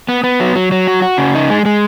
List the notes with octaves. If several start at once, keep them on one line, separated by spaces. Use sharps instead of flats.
B3
B3
F#3
F#3
F#3
F#4
F#4
C#3
D#4
G#3
G#3